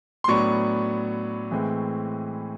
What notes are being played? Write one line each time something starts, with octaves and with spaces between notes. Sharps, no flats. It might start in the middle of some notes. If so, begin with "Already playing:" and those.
C6
A2 F#3 B3 D4 C#6
A2 E3 G#3 C4